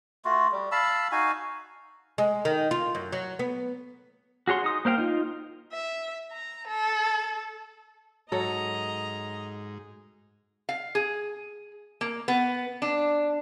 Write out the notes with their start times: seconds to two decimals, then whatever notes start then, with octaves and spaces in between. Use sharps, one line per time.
0.25 A3 F4 F#4
0.52 G3
0.72 F5 A5 B5 E6
1.12 D#4 F#4 F5 G#5
2.18 G#3
2.45 D#3
2.71 F4
2.95 F#2
3.12 F#3
3.39 B3
4.47 F#4 G#4 C#5 C6
4.64 D#4 D#6
4.85 A#3 C5 F5 G5
4.98 D#4 F4
5.72 E5
6.32 A#5
6.67 A4
8.32 G#2 F#3 A4 D#5 A#5
10.69 F5
10.95 G#4
12.01 A#3
12.28 B3
12.82 D4